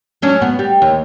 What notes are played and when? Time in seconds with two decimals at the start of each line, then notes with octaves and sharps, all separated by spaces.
0.22 F#3 C#4 D4
0.42 B3
0.59 G3
0.82 D#2